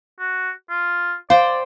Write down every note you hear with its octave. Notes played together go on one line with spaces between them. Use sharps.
F#4
F4
C5 D5 F5 G5